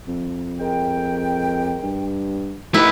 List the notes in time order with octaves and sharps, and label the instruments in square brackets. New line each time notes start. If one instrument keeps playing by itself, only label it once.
[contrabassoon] F2
[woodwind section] G#3 A#4 G5
[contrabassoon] G2
[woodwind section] D#2 D#4 [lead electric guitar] A3 B4 [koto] E4